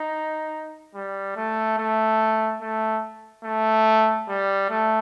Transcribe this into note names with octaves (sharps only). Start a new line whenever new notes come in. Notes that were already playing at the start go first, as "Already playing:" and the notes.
Already playing: D#4
G3
A3
A3
A3
A3
G3
A3